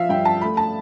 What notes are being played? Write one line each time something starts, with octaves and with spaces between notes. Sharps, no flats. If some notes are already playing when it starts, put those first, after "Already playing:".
Already playing: F3 E5 F5
G2 G5
A5
A3 B5
A5